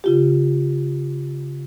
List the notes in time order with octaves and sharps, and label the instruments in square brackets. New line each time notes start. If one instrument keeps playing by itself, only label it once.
[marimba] C#3 F4 G4